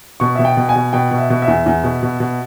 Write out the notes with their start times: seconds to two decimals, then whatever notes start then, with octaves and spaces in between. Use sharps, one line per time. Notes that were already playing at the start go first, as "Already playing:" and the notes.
0.20 B2 C#6
0.36 B2 E5
0.45 G5
0.57 B2
0.69 G#5
0.76 B2
0.93 B2 G5
1.11 B2
1.18 E5
1.30 B2
1.42 E5
1.48 E2
1.66 E2
1.84 B2
2.03 B2
2.20 B2